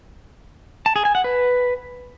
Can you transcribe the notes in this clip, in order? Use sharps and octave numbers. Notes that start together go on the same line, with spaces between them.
A5
G#4
G#5
F#5
B4